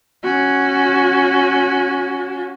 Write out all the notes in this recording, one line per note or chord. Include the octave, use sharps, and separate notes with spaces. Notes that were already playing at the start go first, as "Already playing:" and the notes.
C#4 F#4